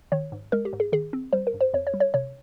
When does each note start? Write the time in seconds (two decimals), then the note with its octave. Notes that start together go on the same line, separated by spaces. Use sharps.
0.12 D#3 C#5
0.32 G#2
0.52 G#3 A#4
0.65 G4
0.73 G#2
0.80 G#4
0.92 D#3 G#4
1.13 C4
1.33 G3 C5
1.47 A#4
1.54 G2
1.61 C5
1.74 F2 C#5
1.87 C#5
1.94 G3
2.00 C#5
2.14 C3 C#5